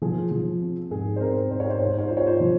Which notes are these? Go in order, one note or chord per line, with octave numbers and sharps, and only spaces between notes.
F3 G#4
F3
C4
G#2 G#4
C5
C4 A#4
G#2 C5
C#5
C5
G#2 C#5
C5
C#5
F4 C5
C#5
C5
F3